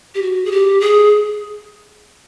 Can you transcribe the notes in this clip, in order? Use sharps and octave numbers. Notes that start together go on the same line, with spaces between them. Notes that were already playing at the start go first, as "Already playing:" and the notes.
G4
F#4
G#4
G4
G#4